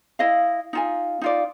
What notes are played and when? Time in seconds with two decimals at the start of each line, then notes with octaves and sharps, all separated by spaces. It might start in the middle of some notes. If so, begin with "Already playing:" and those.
0.19 E4 D#5 F5
0.73 D#4 F4 G#5
1.22 D#4 F4 D5